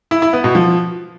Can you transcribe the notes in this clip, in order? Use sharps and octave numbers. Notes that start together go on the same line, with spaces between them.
E4
E4
B3
B2
F3